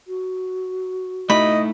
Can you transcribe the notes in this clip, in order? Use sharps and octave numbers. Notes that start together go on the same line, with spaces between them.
F#4
A3 D#4 E4 D#5 B5